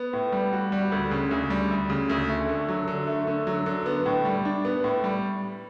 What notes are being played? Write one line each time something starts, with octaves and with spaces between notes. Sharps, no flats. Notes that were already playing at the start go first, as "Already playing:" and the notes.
Already playing: B3
A2
G3
F#4
G3
D2
C#3
D2
G3
D2
C#3
D2
A3
D3
F#3
D3
A3
D3
F#3
D3
B3
A2
G3
D4
B3
A2
G3